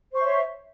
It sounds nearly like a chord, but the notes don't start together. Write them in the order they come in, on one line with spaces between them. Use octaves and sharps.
C5 C#6 E5 C#5